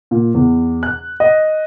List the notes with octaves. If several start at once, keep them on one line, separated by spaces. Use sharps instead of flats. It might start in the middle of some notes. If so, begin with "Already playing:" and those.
A#2
E2
F#6
D#5